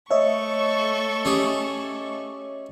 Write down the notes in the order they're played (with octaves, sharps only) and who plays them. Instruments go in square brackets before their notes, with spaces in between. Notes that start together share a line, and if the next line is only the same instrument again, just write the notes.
[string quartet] A3 A4 C#6 [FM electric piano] C#5 D#5 E5
[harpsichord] C#4 G4 G#4